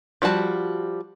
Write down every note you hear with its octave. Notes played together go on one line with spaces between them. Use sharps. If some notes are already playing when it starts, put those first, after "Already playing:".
F3 G3 F#4 A5